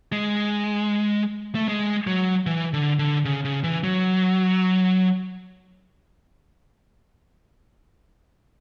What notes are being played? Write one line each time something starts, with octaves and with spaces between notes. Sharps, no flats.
G#3
A3
G#3
F#3
E3
D3
D3
C#3
C#3
E3
F#3